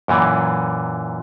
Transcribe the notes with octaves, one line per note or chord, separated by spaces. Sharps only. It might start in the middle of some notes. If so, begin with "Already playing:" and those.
F#2 A#2 E3